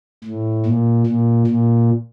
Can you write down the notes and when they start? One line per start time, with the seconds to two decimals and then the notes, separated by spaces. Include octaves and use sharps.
0.24 A2
0.65 A#2
1.06 A#2
1.47 A#2